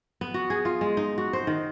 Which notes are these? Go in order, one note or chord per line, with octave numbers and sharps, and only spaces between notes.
B3
F#4
G#4
F4
G#3
D#4
F#4
C5
D#3